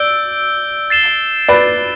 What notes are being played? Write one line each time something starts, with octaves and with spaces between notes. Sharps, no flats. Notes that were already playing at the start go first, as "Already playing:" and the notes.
Already playing: D5 E6 G6 D7 G7
A6 C7 E7 G7
B4 D5